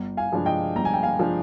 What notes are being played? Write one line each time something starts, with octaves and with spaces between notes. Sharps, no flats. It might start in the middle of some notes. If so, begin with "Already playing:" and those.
Already playing: G1
F5 G#5
G2 F3 G#3 D4
D#5 G5
G1 A#5
G#5
G5
F5 G#5
F3 G#3 D4